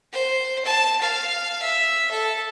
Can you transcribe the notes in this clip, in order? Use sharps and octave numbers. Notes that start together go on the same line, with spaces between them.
C5
A5
F5
E5
A4